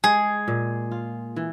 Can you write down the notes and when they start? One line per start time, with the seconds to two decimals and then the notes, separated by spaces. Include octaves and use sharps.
0.04 G#3 G#4
0.48 A#2
0.91 F4
1.36 E3